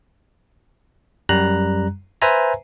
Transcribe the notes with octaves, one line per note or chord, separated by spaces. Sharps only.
F#2 G3 A#5 F#6
B4 C5 E5 G#5 A#5